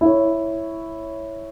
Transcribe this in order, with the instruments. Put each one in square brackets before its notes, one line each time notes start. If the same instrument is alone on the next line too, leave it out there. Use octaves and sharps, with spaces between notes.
[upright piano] E4 C#5